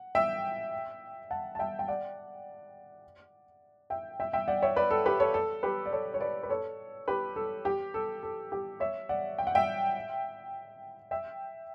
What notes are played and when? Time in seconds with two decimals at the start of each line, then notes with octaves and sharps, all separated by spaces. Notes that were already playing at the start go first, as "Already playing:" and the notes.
Already playing: F#5
0.15 E5 G5
1.31 F#5 A5
1.55 A5
1.59 E5 G5
1.79 G5
1.88 D5 F#5
3.90 E5 G5
4.20 E5 G5
4.33 E5 G5
4.48 D5 F#5
4.62 C#5 E5
4.76 B4 D5
4.91 A4
5.06 G4 B4
5.20 A4 C#5
5.34 A4
5.63 G4 B4
5.86 D5
5.93 A4 C#5
6.14 C#5
6.20 B4 D5
6.43 B4
6.49 A4 C#5
7.08 G4 B4
7.36 A4
7.65 G4
7.94 A4
8.23 A4
8.52 G4
8.80 C#5 E5
9.09 D5 F#5
9.38 G5
9.47 F#5
9.55 E5 G5
11.11 E5 G5